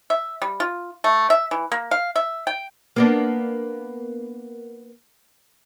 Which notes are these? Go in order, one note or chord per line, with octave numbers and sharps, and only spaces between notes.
E5
G3
F4
A3
E5
E3
A#3
F5
E5
G5
A#3 B3 D4